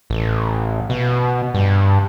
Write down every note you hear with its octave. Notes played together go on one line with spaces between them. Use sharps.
A1
B2
G2